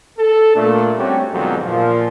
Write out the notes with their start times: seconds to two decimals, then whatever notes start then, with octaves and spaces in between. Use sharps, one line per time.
0.18 A4
0.55 A#2 A3 D4
0.96 G3 A3 C4 C#4 F#4 G4
1.33 F2 G#2 B2 D3 D#3 F#3
1.65 A#2 F3